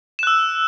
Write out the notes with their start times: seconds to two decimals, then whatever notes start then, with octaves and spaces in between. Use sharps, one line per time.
0.19 E7
0.23 F#6
0.27 E6